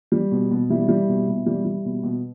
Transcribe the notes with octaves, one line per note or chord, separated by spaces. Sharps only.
G3
B2
B2
G3 E4
G3
B2
B2
G3
G3
B2
B2